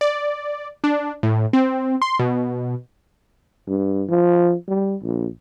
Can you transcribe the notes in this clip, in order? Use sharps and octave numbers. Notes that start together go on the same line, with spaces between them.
D5
D4
A2
C4
C6
B2
G2
F3
G3
A#1